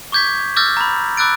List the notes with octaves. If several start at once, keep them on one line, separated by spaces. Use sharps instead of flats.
C#6 D6 G6 G#6 B6
D6 E6 F6 G6 A6 A#6
A#5 B5
B5 D6 E6 F#6 A6 D7